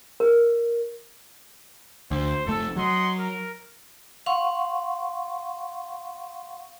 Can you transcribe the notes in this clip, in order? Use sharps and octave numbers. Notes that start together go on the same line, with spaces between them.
A#4
D2 C5
F1 A3 A4
F#3 D#5 F#5 C6
A#4
F5 F#5 C6 C#6